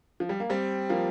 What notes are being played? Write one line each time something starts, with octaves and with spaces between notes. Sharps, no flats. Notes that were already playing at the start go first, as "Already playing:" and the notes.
F3
G3
A#3
G3 C4
F3 A#3